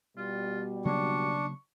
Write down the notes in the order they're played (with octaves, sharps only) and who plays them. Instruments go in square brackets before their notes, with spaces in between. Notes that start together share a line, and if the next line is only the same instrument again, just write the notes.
[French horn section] B2 G3 [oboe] F4
[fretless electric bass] C#3 F#3 A#3 [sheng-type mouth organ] D4 [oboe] C#6